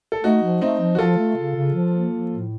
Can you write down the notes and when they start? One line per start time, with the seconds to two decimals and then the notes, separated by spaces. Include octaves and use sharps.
0.12 A4
0.24 A3 D#4 F#4
0.43 F3
0.61 A3 C4 D#4
0.80 F3
0.95 F#4
0.98 F3 F4 A4
1.18 A3
1.37 C#3
1.56 C#3
1.74 F3
1.93 A#3
2.12 F3
2.30 A2